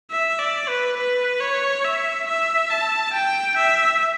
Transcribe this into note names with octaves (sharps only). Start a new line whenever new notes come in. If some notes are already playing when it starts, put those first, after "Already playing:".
E5
D5
B4
B4
C#5
E5
E5
A5
G5
E5